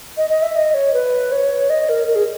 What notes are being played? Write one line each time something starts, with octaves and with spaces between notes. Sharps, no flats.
D#5
D#5
E5
D#5
C#5
B4
C#5
D#5
A#4
A#4
G#4